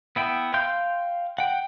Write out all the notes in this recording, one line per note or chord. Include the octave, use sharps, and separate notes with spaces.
B3 E4 G5
F5 G5 C6 G6
F#5 G5